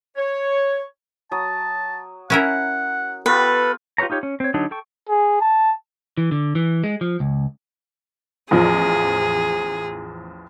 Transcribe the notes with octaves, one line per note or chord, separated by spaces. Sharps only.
C#5
F#3 A5 D#6
C#4 E4 A#4 F#5
B3 F4 G4 A4 B4
F4 G4 B4 C#5 A#5
D#4 F4 G4 C#5
C#4
C4 C#5
D3 F#3 D4 D#4
A4 G5 C#6
G#4
A5
E3
D3
E3
G#3
F3
C#2
A1 E2 F3 G#4